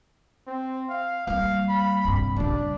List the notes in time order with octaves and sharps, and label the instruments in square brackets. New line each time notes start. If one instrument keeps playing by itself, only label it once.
[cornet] C4
F5
[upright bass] G3 A#3 [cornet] F5
[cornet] B5
[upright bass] G2 C3
[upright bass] C#3 G3 [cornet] D4